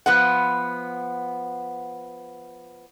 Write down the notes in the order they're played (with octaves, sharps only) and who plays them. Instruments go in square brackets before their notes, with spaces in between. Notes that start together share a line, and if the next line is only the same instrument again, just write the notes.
[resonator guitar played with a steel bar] F3 B3 F#5